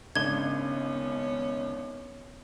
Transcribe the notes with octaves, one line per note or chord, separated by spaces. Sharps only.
G#1 C#3 B3 C#4 D4 G#6 G7